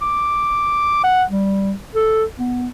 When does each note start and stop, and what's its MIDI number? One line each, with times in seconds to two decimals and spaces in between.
0.02 1.01 86
1.04 1.23 78
1.31 1.72 55
1.95 2.24 69
2.39 2.67 59